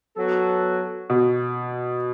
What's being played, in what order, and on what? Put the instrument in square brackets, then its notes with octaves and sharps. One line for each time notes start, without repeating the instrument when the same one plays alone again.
[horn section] F#3 B3 F#4 A4
[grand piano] B2